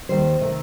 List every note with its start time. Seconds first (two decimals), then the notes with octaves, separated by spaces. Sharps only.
0.09 D#2 D#3 G3 C5
0.41 C3 D#3 A3